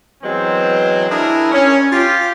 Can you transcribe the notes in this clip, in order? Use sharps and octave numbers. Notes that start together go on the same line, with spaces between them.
E3 F#3 G#3 B3 C4
D4 E4 G#4 A#4
C#4
F4 G4